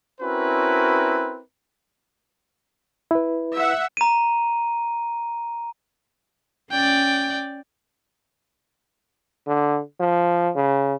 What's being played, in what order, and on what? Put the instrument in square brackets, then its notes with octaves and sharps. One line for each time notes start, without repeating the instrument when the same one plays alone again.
[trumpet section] C4 C#4 E4 F#4 A#4 B4
[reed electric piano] E4 B4
[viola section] E5 F#5
[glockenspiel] A#5 D#7
[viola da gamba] C#4 D5 [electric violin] G5
[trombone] D3
F3
C#3